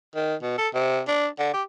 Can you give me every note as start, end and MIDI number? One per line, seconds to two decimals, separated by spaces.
0.16 0.35 51
0.43 0.53 47
0.58 0.68 69
0.74 1.01 48
1.08 1.27 62
1.39 1.50 50
1.54 1.63 67